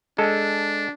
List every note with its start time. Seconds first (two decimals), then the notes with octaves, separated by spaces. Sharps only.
0.18 G#3 D4 A4